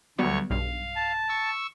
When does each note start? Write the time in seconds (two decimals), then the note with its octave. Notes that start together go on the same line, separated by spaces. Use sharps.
0.18 D2 F#3 G3 B3 C#5 C#6
0.50 B1 G2 F5
0.96 A5
1.29 C#6 E6